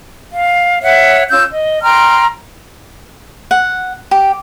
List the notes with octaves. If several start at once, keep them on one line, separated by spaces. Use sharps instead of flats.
F5
C#5 E5 F#5
C#4 F4 E6 G6
D#5
G5 A#5 C6 F6
F#5
G4